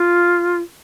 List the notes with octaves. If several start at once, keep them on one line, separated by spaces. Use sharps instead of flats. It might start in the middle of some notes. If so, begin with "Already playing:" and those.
Already playing: F4